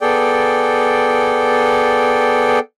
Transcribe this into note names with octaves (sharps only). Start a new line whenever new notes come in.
B3 G#4 A4 D5 G5